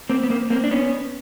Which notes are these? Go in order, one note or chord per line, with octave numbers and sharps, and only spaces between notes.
A#3 C4
B3
A#3 C4
A#3 C4
D4
B3 C#4